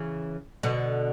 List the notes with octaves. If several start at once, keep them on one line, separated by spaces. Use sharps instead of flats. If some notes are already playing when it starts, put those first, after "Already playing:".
Already playing: C#3 E3
B2 D3